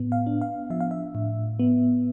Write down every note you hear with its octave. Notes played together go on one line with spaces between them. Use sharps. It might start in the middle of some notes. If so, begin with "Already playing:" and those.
Already playing: A2 B3
F5
D4
F5
F3 E5
F5
E5
A2
B3